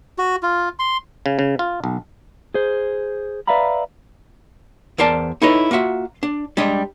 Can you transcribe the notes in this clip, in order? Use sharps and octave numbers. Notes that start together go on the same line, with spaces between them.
F#4
F4
C6
C#3
C#3
F4
B1
G#4 C5
B4 D5 E5 F5 A#5 B5
E2 A#4 C5 D5 A5
D#4 E4 A4 B4 C#5 D#5
A#3 F4 F#4 E5
D4
G3 G#3 D4 D#5